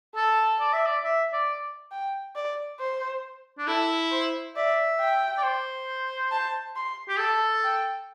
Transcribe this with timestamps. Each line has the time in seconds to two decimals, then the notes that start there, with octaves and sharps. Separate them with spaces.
0.16 A4 A5
0.60 D5
0.73 E5
0.86 D5
1.04 E5
1.33 D5
1.92 G5
2.35 D5
2.80 C5
3.59 D4
3.67 E4 A4
4.12 C5
4.56 D5 E5
5.00 G5
5.38 D5
5.44 C5
6.32 A5
6.76 C6
7.08 G4
7.19 A4 A5
7.64 G5